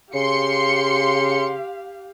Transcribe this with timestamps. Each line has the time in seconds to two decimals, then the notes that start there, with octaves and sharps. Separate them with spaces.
0.14 C#3 G4 F5 C6 C#7